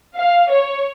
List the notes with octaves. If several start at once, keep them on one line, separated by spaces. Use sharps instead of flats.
F5
C#5